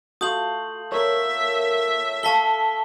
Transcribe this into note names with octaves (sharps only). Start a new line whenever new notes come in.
A3 F4 F#4 D#6 G6 F#7
A#4 C#5 E5
A4 F5 A5 C#6 B6 G7